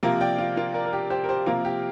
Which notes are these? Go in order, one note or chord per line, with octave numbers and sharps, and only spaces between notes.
C3 F3 A#3 F4 A#4
D5 G5
F4
F4 A#4
A#4 D5
A#4
G4
G4 C5
A#4
G4 C5
C3 F3 A#3 F4 A#4
G4